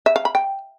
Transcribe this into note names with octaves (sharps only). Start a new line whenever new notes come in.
E5
F5
B5
G5